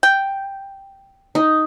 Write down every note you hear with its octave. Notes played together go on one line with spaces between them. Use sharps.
G5
D#4